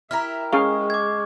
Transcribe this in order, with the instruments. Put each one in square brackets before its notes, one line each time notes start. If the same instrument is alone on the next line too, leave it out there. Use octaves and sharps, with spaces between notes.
[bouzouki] E4 G4 A#4 [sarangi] E5 [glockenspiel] F6
[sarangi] G#3 [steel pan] C#4 G#4 F5 [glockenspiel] C#6
[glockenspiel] D6 G#6